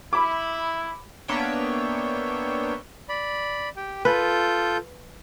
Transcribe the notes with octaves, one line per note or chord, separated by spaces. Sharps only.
E4 B5 D6
A#3 B3 D4 C#5 E5 G5
D5 B5
G4 G5
F4 A4 B4 G6